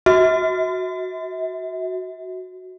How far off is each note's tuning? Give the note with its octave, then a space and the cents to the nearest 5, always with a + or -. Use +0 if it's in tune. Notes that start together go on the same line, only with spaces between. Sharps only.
F#4 +0 E5 -40